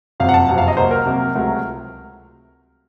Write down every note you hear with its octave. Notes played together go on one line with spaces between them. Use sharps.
F#1 F2 C3 F#3 F5
F#5
A5
F#1 F2 C3 F#3 F#5
F5
D#5
C2 C3 F#3 A#3 C5
A#4
C2 C3 F#3 A#3
C#2 C3 F#3 A3